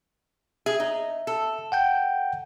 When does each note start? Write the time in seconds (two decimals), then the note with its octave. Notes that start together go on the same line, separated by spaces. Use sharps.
0.66 G#4 E5
0.80 D#4
1.27 A4
1.72 F#5 G5 G6